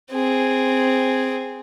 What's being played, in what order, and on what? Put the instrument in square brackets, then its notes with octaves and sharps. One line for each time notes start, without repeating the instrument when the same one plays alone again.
[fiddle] C4 G#4